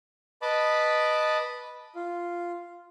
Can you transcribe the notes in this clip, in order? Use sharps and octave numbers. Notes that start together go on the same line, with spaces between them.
B4 D#5 A5 B5 D6
F4